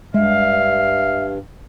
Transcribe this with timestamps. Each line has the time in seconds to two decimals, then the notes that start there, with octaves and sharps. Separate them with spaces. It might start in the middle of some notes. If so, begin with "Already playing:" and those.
0.14 G2 G#3 E5 F5